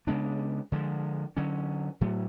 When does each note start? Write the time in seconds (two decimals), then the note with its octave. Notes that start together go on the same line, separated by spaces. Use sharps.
0.07 C#3 G#3 B3 D4
0.72 D3 F3 G#3
1.37 D3 F#3 C#4
2.01 A2 F#3 A3